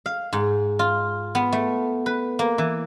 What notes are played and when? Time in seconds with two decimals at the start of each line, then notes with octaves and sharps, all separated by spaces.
0.06 F5
0.33 G#2
0.79 F4
1.35 B3
1.52 A3
2.06 B4
2.39 A#3
2.58 E3